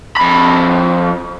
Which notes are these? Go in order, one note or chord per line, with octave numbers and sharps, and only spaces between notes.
F2 B5